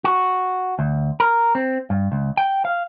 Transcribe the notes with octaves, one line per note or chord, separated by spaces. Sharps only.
F#4
D2
A#4
C4
G2
C#2
G5
F5